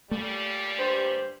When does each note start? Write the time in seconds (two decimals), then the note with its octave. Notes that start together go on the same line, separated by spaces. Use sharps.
0.11 A#2 C#3 G3 A3
0.77 G2 G4 C5